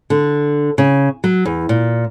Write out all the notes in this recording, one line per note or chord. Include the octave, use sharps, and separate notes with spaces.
D3
C#3
F#3
E2
A#2